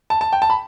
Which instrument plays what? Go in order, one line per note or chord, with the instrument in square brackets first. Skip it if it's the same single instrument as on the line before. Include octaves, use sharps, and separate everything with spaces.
[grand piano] A5
A5
G5
A5
B5